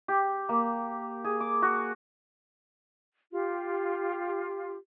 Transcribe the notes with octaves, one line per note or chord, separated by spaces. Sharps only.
G4
A#3
G#4
D6
F#4
F4 G4